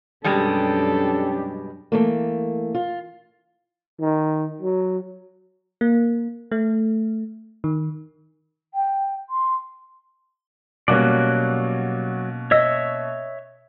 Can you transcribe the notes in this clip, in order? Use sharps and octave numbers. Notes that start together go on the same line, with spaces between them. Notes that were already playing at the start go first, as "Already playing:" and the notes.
F#2 B2 G3 G#3 C#4 D4 G4 A4
E3 A3 A#3
F4
D#3
F#3
A#3
A3
D#3
G5
C6
B2 F#3 G3 A#3 C#4 F#4 D5
C#5 D#5 E5 E6